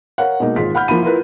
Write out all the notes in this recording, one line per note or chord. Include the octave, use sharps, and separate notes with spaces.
A#4 C#5 F5 F#5
B2 G#3 A#3 D#4
G#1 F4 G#4 B6
F#5 B5 F6 G6
F3 A#3 E4 B5 D#7
E4 F4 A#4 B4